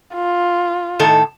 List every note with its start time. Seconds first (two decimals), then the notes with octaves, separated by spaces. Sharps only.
0.15 F4
0.99 A2 D#3 A4